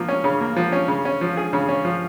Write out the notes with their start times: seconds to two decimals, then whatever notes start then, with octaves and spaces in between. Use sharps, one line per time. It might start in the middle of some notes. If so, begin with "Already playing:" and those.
Already playing: F3 A#3
0.08 C#4
0.24 C#3
0.41 A#3
0.56 F3
0.72 C#4
0.88 C#3
1.05 C#4
1.21 F3
1.37 G#4
1.53 C#3
1.69 C#4
1.85 F3